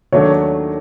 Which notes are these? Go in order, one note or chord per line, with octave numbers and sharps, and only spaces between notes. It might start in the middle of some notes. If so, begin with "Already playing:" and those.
D#2 D#3 F#3 A3 D4 C#5